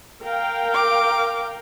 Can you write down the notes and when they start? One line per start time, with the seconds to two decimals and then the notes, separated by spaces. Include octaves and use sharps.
0.23 A#4 F5 G5
0.74 D6